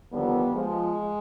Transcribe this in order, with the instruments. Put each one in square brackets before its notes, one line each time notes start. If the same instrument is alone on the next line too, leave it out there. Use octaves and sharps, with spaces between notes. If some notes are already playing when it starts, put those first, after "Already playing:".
[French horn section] D#2 D3 F3 G3 B3
F3 G#3